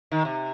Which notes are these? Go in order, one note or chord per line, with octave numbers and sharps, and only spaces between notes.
D#3
C3